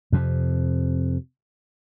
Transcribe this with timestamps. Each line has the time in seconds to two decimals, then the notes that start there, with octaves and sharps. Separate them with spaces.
0.12 F2 C3